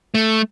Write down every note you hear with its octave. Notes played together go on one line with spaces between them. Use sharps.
A3